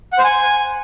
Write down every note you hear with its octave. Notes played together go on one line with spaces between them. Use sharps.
F#5
C5
G#5